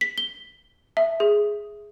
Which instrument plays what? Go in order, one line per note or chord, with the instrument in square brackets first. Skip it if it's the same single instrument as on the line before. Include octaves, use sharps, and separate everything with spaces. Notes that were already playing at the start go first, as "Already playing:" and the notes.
[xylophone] B6
G7
E5
G#4